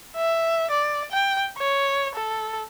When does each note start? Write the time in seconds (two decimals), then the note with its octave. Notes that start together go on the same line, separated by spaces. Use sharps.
0.16 E5
0.71 D5
1.11 G5
1.58 C#5
2.15 A4